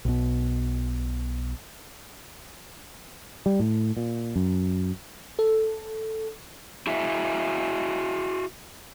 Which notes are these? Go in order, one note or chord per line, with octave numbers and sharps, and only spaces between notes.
B1 B2
G3
A2
A#2
F#2
A4
E4 F#4 G#4 E5